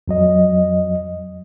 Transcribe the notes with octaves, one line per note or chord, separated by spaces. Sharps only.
F2 F#3 D#5